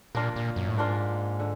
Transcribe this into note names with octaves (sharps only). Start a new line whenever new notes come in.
A#2 A#3 D4 F4 A#4
A#2
F#2
A2
G#2 A#3 D4 F4 A#4
D3